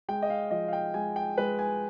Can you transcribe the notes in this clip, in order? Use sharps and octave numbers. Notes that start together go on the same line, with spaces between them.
G#3 G5
D#5
F5
F3 D#5
F5
G5
G#3 G#5
G5
G#3 B4
G#5